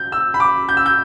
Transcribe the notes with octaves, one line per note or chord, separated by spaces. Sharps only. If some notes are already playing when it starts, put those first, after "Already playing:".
Already playing: G6
E6
B5
D6
G6
E6
G6